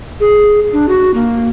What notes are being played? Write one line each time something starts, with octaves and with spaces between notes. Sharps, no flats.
G#4
D4
F#4
A#3